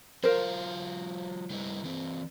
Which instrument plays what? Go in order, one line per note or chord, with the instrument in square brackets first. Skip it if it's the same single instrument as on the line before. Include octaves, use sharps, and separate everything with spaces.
[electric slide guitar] F#3 F4 F5 [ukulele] A#4 C5
[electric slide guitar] G3 D#4 E4
E3 C4